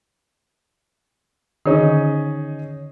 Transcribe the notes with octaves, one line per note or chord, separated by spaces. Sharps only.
D3 D#3 C#4 D#4 G#4